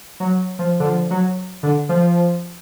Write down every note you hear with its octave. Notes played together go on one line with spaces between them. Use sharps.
F#3
F3
D3
F3
F#3
D3
F3